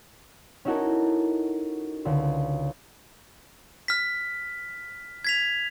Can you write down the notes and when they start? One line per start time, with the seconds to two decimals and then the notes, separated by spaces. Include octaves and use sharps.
0.65 C#4 D#4 E4 F#4 A4 A#4
2.05 C#2 D3
3.88 F6 B6
5.25 G#6 B6 F7